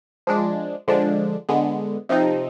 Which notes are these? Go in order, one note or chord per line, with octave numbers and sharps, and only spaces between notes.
F3 G#3 D4
D3 F3 G#3 D4
D3 G#3 B3
C3 F3 C4 D#4